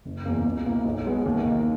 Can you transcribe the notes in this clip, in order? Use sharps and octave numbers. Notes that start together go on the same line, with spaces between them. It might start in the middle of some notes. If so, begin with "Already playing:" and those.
F#1
E2 B2 A#3
C#2
B2 A#3 E4
B1
B2 G#3 B3
D#2
D#3 A#3